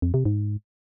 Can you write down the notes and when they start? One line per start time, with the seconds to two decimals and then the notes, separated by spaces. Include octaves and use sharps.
0.02 F2
0.14 C3
0.25 G#2